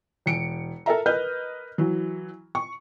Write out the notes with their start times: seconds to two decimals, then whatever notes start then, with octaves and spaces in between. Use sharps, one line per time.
0.26 E1 C#7 D7
0.86 A4 A#4 E5 A#5
1.06 A#4 B4 D#5 F6 G6
1.78 E3 F#3
2.55 C#6